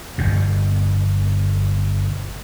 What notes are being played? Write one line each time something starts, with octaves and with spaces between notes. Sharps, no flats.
G1 G2 B2